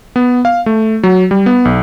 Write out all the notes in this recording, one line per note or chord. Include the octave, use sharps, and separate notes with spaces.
B3
F5
A3
F#3
G3
B3
B1